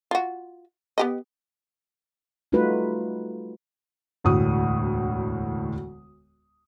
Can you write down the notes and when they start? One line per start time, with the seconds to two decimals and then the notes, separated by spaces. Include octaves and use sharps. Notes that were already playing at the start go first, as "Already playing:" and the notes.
0.11 F4 F#4
0.98 B3 G4 D#5
2.52 G3 A3 D#4 F4 F#4 B4
4.24 E1 D2 A2 F#4 D#6